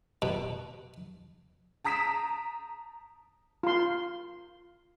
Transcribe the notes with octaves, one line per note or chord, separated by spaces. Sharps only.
B2
A5 A#5 D#6 B6 D7 E7
F4 C6